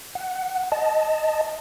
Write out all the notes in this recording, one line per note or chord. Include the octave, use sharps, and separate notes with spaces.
F#5
D#5 A5